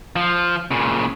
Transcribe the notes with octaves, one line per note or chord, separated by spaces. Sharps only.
F3
A#2 C#3